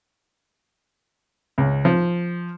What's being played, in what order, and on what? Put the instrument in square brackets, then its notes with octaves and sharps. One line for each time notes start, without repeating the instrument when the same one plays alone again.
[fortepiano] C#2
F3